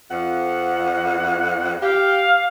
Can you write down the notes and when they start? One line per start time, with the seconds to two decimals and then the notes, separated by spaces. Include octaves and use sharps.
0.10 F2 F#5
1.82 G4 F5